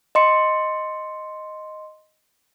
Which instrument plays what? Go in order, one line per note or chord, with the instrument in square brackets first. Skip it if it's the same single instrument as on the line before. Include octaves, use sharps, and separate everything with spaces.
[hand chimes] D#5 C6 C#7